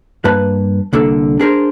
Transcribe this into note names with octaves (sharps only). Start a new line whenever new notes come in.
G2 A#3 B4 A5
C2 D3 A#3 A4
D4 G#4 A#4 C5